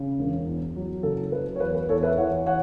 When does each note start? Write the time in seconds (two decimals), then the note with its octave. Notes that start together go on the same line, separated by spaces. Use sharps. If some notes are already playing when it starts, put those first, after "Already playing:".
Already playing: C#3
0.19 E1
0.46 E2
0.76 F#3
1.03 F#1 A4
1.32 F#3 B4
1.56 C#5
1.60 E2 B4
1.74 B4
1.89 E2 A4 C#5
2.03 B4 E5
2.17 E3 C#5 F#5
2.46 C#5 F#5